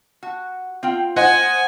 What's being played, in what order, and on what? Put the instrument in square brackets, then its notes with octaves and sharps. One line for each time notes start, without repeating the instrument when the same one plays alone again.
[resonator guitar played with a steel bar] F#4
C4 F4 G5
[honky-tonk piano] C5 D#5 F#5 [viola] G#5